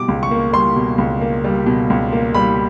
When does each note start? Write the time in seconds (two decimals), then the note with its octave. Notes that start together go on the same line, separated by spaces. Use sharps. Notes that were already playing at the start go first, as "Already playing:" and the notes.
Already playing: B2 G3 D6
0.08 C#2
0.23 C#6
0.31 A#3
0.53 G3 C6
0.76 B2
0.98 C#2
1.21 A#3
1.45 G3
1.66 B2
1.90 C#2
2.12 A#3
2.34 G3 B5